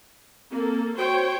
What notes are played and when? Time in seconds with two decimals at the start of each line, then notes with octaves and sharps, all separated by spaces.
0.51 A#3 C4 A4
0.98 F#4 C5 C#5 G5